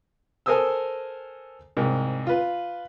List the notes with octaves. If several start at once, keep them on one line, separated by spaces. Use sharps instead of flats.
A4 A#4 C5 G#5 D#6 E6
C2 G#2 A#4
F4 B4